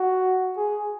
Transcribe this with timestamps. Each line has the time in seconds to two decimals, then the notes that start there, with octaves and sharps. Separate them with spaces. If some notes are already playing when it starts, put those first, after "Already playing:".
Already playing: F#4
0.57 G#4